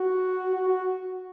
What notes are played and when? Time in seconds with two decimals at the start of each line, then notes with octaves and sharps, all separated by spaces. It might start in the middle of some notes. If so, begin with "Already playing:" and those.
Already playing: F#4
0.54 F#4
0.68 F#4